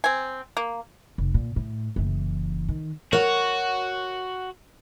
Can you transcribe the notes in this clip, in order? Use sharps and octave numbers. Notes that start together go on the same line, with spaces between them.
C4 G#5
A#3
F1
A#2
A2
F#1 E3
D#3
F#4 A#4 C#5 F#5